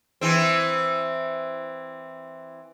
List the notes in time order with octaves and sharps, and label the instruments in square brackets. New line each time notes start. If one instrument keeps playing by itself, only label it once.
[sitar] E3 C4